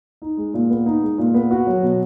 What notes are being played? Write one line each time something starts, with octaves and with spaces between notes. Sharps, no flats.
D#4
G#3
A#2
B3
D#4
G#3
A#2
B3
F#4
F#3
B2